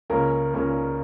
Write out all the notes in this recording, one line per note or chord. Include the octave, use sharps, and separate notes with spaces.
C#2 C#3 A#3 C#4 A#4
C#2 C#3 A#3 C#4 A#4